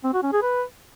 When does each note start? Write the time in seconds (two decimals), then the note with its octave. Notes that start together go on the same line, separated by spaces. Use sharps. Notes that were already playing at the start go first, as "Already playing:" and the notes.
0.04 C4
0.13 F#4
0.23 C#4
0.33 G#4
0.42 B4